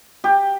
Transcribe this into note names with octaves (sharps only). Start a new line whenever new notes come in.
G4